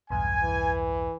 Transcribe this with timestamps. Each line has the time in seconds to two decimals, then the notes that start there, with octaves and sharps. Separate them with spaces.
0.10 B1 E2 G2 G#5
0.43 E3